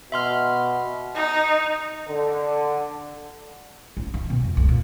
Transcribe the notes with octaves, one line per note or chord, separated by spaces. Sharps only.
B2 E5 C6 F6
D#4
D3
A1
D#3
B2
F2
D2
A#2